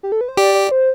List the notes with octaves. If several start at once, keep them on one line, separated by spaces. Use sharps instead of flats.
G4
A4
B4
C5
G4 D5
D5
C5